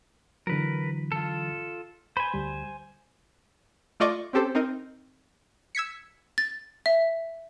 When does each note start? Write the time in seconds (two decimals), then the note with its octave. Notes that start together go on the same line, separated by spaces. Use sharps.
0.47 D3 E3 F#3 A#4 B4
1.12 F4 A4
2.17 C5 G#5 B5
2.34 D2 G3
4.00 A3 F4 D5 D#5 C#6 D6
4.33 C4 C#4 G4 A4 C5
4.55 C4 D#4 A#4 D#5
5.75 E6 G#6 B6 C#7
6.38 A6
6.86 E5